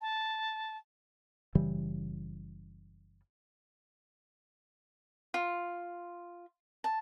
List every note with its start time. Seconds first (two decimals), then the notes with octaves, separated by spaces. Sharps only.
0.01 A5
1.55 F#1 C#3 E3 G3
5.34 F4
6.84 A5